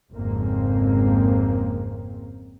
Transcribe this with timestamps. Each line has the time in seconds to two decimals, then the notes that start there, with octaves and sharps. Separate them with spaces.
0.12 G#1 F2 G#2 C#3 A#3 C4